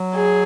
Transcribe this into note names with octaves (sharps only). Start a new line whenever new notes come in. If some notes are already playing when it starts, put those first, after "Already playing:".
Already playing: F#3
G#4